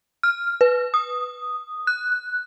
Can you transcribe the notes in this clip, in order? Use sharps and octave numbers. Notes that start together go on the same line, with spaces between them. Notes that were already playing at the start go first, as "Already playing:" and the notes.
F6
B4
D#6
F#6